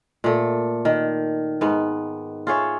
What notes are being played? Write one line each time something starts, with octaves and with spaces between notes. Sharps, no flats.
A#2 A3
D#3
G#2 B3
F4 G#4 C#5 E5